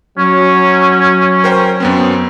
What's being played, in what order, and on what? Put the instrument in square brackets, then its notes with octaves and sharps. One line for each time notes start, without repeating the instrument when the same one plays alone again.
[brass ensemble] F#3 [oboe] C#4
[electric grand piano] A#4 C5 G5
F#2 B3 C4